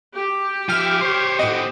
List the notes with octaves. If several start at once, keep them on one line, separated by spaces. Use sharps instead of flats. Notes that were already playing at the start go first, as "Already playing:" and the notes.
G4
F3 E5 G5 F6
C5 C#5
A2 C4 F#4 D#5